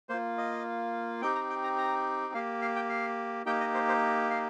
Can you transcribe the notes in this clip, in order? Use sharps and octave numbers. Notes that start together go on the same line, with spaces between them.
A#3 F4 C5
D#5
C4 D#4 G4 G5
A#5
G5
A#5
A#5
A#3 G4 F5
F5
G5
F5
A#3 D#4 G4 G5
D#5
C5
C5
F5